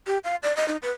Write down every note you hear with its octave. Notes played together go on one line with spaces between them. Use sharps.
G4
F5
D5
D#5
D#4
B4